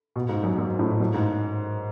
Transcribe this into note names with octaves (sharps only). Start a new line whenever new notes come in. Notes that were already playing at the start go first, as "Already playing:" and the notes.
B2
G#2
F#2
F#2
A2
F#2
G#2